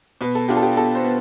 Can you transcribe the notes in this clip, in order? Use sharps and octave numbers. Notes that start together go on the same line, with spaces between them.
B2 B4
A4
B3 D4 F4 G4
A4
G4
B2 A4
C5
B3